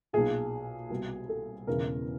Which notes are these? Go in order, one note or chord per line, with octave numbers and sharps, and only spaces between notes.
B1 A#2 G#4
C2 B2
A4
E1 E2 C#3 E3 A#4